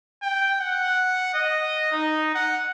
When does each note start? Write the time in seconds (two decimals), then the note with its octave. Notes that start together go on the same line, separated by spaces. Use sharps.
0.23 G5
0.60 F#5
1.34 D#5
1.92 D#4
2.35 F#5